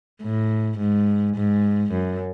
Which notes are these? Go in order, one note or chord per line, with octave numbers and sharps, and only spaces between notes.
A2
G#2
G#2
F#2